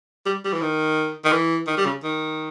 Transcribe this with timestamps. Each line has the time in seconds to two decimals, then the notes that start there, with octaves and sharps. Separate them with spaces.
0.26 G3
0.45 G3
0.53 E3
0.61 D#3
1.25 D#3
1.32 E3
1.68 D#3
1.77 G3
1.86 C#3
2.04 D#3